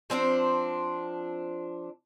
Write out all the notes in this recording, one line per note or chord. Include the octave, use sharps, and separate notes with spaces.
F3 C4 D4 C5